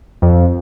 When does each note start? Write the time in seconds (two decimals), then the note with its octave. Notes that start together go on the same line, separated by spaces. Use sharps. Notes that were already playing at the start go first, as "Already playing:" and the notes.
0.22 F2